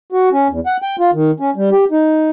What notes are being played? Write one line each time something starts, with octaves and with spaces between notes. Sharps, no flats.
F#4
C#4
E2
F#5
G5
F4
D#3
C#4
G3
G4
D#4